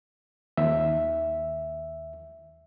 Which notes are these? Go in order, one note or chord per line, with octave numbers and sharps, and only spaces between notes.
D#2 E5